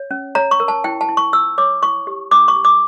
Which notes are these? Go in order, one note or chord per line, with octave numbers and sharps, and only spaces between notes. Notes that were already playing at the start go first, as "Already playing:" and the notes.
Already playing: C#5
C#4
C#5 A#5
C#6
A#4
A5
E4 G5
A5
E4
C#6
F4 E6
C#5 D6
E4 C#6
G4
C#4 D6
C#6
G4
D6